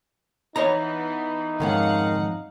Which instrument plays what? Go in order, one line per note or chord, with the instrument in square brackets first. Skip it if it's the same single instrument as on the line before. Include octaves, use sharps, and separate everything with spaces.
[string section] E3 B3 [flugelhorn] D#4 [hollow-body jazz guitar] C#5 D#5 A#5
[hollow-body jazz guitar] F2 G#2 C#4 [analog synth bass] D#3 [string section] F5 F#5 C7